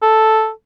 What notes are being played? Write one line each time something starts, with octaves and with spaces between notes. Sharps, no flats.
A4